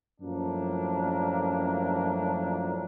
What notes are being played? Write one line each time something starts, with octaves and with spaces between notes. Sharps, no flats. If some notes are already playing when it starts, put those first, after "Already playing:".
F#2 A2 F3 A#3 D4